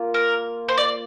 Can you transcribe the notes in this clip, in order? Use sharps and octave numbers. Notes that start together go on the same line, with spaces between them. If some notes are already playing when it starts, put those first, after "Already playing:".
Already playing: A#3 F4
A#4
C5
D5